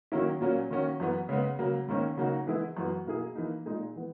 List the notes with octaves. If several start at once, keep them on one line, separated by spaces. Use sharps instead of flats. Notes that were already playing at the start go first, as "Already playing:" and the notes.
D#3 F#3 A#3 C#4 E4
A#2 F#3 A#3 C#4
D#3 A#3 C#4 F#4
F#2 E3 B3
C#3 G#3 B3
C#3 F#3 A#3
G#2 D#3 A#3 C#4
C#3 F#3 A#3 D#4 F#4
E3 G#3 B3 E4 G#4
F#2 E3 B3 F#4
B2 A#3 E4 G#4
E3 A#3 D#4
A#2 G#3 D#4 G#4
E3 B3